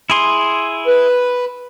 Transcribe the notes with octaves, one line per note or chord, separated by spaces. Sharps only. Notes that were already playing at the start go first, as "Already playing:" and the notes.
E4 G#4 C6
B4